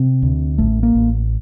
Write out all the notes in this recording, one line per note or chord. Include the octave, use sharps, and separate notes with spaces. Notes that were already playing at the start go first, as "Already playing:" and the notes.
Already playing: C3 C4
D2
A1 A3
A#3
A1